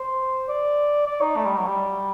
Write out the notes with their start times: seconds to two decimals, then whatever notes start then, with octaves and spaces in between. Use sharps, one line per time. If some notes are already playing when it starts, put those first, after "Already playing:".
Already playing: C5
0.49 D5
1.06 D5
1.21 D#4
1.36 A3
1.46 G3
1.56 F#3
1.67 G3